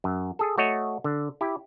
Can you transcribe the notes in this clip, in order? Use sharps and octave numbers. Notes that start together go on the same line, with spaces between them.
F#2
G#4 A4
A3 F#4 C#5 D#5
D3
E4 G4